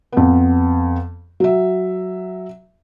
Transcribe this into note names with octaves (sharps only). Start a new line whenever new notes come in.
F2 B3
F#3 E5